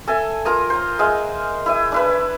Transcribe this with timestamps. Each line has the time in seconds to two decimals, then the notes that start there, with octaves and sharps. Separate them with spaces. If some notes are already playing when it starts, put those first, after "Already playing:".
0.08 A4 E5 G#5
0.45 F4 A#4 A#5 D#6
0.70 C5 A#5
0.99 G#3 E5 F5 D#6
1.66 E4 E5 D#6
1.92 D4 E4 B4